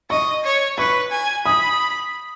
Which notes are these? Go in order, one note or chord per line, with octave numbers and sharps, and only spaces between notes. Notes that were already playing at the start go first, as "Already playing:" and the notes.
D#5 C#6
C#5
B4 C#6
G#5
B5 D#6